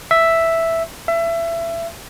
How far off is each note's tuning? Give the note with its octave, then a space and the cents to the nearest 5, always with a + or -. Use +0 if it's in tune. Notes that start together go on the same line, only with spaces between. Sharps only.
E5 +0
E5 +25